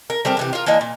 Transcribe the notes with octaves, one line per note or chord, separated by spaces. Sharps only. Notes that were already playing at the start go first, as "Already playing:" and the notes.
A#4
G3 A3 C4 A#4
C3 E3 G4
F4 A#4
E3 A#3 D4 D#4
A#2